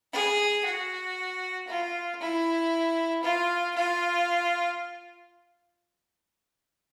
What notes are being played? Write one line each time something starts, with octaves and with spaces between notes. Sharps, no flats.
G#4
F#4
F4
E4
F4
F4